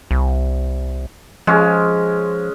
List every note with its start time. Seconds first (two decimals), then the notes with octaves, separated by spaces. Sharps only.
0.11 C2
1.47 F3 G#3 C#4